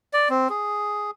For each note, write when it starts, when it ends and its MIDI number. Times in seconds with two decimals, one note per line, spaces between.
0.13 0.28 74
0.30 0.48 60
0.50 1.11 68